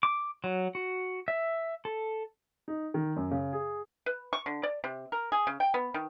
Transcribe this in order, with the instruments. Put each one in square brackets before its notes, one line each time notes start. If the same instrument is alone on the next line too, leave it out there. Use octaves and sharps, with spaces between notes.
[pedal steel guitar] D6
F#3
F#4
E5
A4
[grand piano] D#4
D#3
F#2
C#3
G#4
[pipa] B4
C#6
D3
D5
C3
A#4
G#4
C#3
G5
B3
D#3